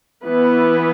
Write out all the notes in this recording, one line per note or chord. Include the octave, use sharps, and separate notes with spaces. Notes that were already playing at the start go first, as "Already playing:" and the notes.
E3 B3 E4 B4